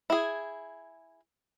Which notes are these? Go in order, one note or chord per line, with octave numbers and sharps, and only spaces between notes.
E4 G#4